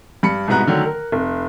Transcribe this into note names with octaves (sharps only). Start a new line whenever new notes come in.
G2 B5 C#7
C2 G#2 B2 B3 A#5 F#6
D3 D#3 F#3 A3
A#4
F1